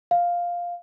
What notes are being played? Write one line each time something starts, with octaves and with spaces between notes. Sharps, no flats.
F5